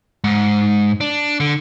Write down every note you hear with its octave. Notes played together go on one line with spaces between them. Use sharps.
G#2
D4
D3